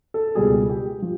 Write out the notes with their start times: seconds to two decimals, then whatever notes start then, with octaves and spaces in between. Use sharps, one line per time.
0.14 A4
0.35 C#2 B2 G3 G#4
0.69 G4
1.02 F3